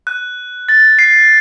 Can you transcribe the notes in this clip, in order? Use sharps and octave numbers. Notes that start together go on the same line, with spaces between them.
F#6
A6
C7